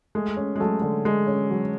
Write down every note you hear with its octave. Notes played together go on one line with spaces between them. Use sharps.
G#3 A3
C#4
G#3
F#3 A3
D3
G#3 A3
C#4
F#3